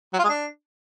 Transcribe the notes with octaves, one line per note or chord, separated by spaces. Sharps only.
F#3
F4
G#3
D4